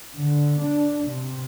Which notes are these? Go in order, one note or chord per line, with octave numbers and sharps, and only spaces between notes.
D3
D4
C3